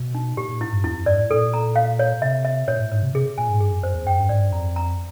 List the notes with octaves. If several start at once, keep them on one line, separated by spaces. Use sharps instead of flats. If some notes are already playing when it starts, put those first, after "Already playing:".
Already playing: B2
D#4
A#2 G4
A#2
A2 E4
G2
E2 E4
F2
G2 D5
A2
A#2 A4
A#5
F5
C#5
C3 E5
E5
A#2 C#5
A2
G#2 C#5
C3
C3 G#4
A#2 G#5
G#2
G2 G#4
F#2
F#2 C5
E2
F#2 G5
G2
G#2 D5
G2
F2 A#5
A#5